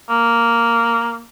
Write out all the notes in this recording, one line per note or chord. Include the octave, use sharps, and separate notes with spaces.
A#3